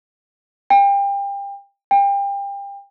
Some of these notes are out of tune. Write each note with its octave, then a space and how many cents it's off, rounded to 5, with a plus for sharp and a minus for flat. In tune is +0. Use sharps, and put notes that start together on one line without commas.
G5 +30
G5 +30